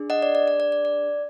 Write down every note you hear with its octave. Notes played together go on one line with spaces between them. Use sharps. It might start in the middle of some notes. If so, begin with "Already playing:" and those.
Already playing: D4 G#4
D#5 F#5
D5
D5
D5
D5
D5
D5